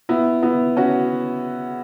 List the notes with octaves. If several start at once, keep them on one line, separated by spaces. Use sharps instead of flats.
B3 E4
B3 E4
C#4 F#4